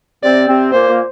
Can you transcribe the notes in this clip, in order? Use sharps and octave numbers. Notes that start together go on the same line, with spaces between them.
C3 C4 D5
C3 C4
A#2 A#3 C5
A#2 A#3